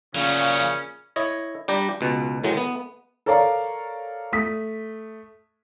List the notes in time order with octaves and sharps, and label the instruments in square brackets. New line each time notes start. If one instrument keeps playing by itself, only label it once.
[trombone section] A#2 C#3 [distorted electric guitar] F#3 A3 [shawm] C#4
[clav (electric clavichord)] E4 C#5 D#5
G3 D4 G4 A#5
C#2 B2
A2 D#3 F#3 G#3
B3
[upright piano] A4 A#4 C#5 D5 F5 A#5
A3 D#6 B6